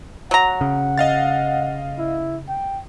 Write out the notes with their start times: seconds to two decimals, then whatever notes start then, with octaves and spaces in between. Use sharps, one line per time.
0.31 F#3 F#5 A#5
0.61 C#3
0.98 D#5 F5 A6
1.98 E4
2.48 G5